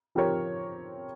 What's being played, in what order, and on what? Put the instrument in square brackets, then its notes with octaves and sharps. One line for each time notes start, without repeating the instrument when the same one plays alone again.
[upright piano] F3 C4 G4 A#4 C#5